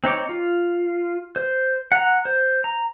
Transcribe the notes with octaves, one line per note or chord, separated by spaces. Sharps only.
C4 D#4 C#5 D6
F4
C5
F#5 A#5
C5
A#5